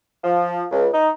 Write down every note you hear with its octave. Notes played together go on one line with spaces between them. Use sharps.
F3
C#2
D#4